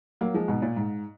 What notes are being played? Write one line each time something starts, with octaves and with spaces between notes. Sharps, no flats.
F#3 A#3
F3 G#3
G#2 B2
A#2
G#2